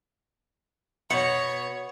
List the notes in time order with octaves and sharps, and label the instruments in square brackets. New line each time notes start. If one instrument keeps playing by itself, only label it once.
[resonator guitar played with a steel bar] B2 [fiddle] C#5 [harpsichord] F#5